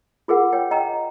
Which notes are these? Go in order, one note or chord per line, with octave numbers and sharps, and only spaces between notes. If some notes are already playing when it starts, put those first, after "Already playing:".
F4 G#4 A#4 F#5
C#5 G5
D#5 G5 A#5